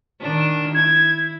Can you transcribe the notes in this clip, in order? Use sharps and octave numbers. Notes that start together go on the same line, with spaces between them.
D#3 D4
E4 G#6